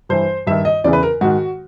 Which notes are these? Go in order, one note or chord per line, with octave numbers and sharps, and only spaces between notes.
G2 E3 C5
G2 D#3 E5
D#5
E2 C#3 E3 D5
B4
A#4
G#2 D#3 F#4